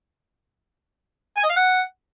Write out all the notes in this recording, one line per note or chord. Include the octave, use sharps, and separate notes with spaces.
G#5
D#5
F5
F#5